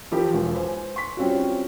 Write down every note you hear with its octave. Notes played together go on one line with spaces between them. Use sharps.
E3 F3 E4 G4 A#4
E1 F4
B4 C5 G#5
C6 C#6 B6
G3 C4 C#4 F4 F#4